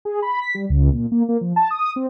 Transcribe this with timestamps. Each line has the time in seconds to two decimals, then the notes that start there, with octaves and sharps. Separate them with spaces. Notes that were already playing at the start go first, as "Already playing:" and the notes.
0.05 G#4
0.22 B5
0.42 B6
0.54 G3
0.69 C#2
0.93 A#2
1.12 A#3
1.29 A#3
1.41 F3
1.56 A5
1.71 D#6
1.96 C4